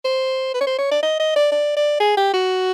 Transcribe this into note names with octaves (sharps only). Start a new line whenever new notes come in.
C5
B4
C#5
C5
C#5
D5
D#5
D#5
D5
D5
D5
G#4
G4
F#4